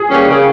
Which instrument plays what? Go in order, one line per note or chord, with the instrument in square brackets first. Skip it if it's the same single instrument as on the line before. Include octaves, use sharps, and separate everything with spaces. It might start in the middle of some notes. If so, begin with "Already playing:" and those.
Already playing: [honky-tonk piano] G#4
[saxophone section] E3 G3 A#3 C#4
C#3